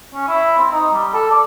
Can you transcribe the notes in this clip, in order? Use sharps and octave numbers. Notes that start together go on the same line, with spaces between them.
C#4
E4
C4
D#4
G3
A4
D5